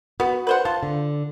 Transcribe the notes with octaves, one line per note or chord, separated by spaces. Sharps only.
B3 F#4
B4 C5 F#5
F4 A5
D3